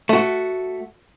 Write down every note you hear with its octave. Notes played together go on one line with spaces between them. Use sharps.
A3 F#4